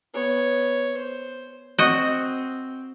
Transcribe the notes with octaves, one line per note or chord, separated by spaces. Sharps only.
B3 C#5
C5
C4 F#4 D#5